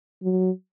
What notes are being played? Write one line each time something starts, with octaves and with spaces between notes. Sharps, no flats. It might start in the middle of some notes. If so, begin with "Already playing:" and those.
F#3